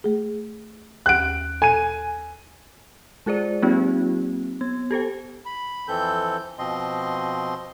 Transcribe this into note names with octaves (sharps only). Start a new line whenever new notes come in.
A3 G#4
D#2 F#5 G5 F#6 D7
A4 G#5 D#7
G#3 F4 G#4 C5 D5
F#3 A#3 C4 D#4 F4 G4
B3 G#6
G4 A4 C5 G5
B5
F2 E3 C4 A4 G6
B2 F3 C4 D#5 C6